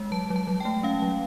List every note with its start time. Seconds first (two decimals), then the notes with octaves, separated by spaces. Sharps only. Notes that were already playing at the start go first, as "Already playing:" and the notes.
Already playing: G#3
0.12 F#3 A5
0.30 F#3
0.36 A5
0.47 F#3
0.60 A3 G5
0.83 C#4 F5
1.02 F#3